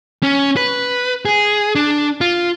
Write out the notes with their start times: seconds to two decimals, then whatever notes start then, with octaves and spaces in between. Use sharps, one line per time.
0.23 C#4
0.56 B4
1.25 G#4
1.75 D4
2.21 F4